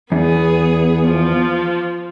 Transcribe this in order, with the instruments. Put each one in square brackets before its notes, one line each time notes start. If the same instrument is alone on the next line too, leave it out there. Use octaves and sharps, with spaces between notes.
[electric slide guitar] E2 [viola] B3 G#4
[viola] F3